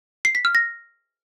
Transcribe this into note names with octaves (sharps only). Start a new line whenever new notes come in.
C7
B6
F6
A#6